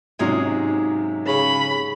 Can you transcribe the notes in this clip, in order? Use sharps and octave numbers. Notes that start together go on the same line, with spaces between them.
G#2 C3 F#3 C#4 G#4 F5
C#3 B5